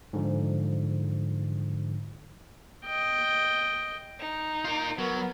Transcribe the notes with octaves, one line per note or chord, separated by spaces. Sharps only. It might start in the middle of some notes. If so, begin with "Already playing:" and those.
G#2 D3 F3
D#5 G5
D#4
F4 A#4
F#3 B3 A#4